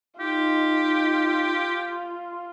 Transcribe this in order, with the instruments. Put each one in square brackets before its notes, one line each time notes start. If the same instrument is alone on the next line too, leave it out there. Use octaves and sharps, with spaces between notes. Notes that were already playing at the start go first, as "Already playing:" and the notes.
[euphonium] D#4 [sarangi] F4 [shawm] G4